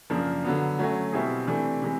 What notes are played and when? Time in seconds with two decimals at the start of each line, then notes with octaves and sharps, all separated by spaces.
0.10 F#2 C#3 F3 A#3 D4
0.44 D3 F#3 B3
0.79 F#3 A3 C#4 F#4
1.12 B2 G3 C4 E4 G#4
1.47 C3 E3 A3 D4
1.82 C3 E3 G#3